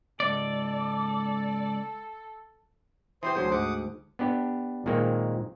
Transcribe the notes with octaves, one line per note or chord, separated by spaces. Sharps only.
C#2 G#2 A4 D5
E3 C4 G4 C5 C6 D#6
D2 F#3 G#4
D2 G#2 F#5 D6 D#6
B3 D4 G4
A#2 D#3 G#3 A#3 C4